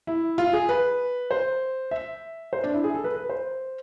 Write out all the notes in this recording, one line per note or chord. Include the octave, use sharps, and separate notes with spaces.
E4
F4
G#4
B4
C5
E5
C5
D4
E4
G#4
A4
B4
B4
C5